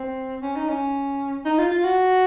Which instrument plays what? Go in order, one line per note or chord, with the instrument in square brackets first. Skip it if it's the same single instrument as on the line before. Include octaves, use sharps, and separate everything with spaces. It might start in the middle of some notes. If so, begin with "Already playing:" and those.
Already playing: [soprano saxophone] C4
C#4
D#4
C#4
D#4
F4
F4
F#4